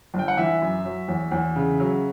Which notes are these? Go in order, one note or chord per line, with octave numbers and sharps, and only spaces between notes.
G1
G5
F#5
E3 E5
F#2
F#3
E2
E2
C#3
F#3